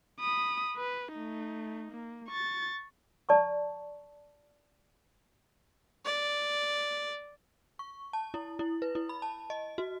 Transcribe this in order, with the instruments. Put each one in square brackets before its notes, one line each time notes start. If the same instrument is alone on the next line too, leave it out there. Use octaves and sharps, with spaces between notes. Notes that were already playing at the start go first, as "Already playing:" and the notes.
[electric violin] B5 D#6
B4
A3 D#4
A#3
C#6 A6
[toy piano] D5 A5 A#5 C#6
[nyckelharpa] D5
[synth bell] C#6
A5
E4
E4
B4
E4
B5
A5
D#5
F#4